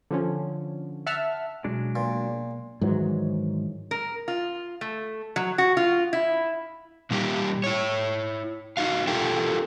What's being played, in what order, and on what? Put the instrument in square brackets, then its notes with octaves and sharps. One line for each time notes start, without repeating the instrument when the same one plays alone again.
[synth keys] D3 F3 C#4
E5 F#5 A5 F6
[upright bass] B2 [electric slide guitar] F#3 G#3 D4
[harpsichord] A#2
[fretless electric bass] G#2 D#3 E3 F#3
[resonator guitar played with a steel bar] A#4
F4
A3
F#3
F#4
F4
E4
[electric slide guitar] A#2 G3 D#4 G4
E4 C#5
D#4 F#4 F5
F4 G4 A4 A#4 G5